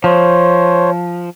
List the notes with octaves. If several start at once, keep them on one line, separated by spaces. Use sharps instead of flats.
F3 C5 C#5